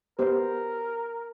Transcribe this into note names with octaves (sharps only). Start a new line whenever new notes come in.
B3 G4 A#4 C5